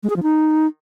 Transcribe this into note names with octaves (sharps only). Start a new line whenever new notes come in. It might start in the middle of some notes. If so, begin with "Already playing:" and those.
G#3
G#4
F3
D#4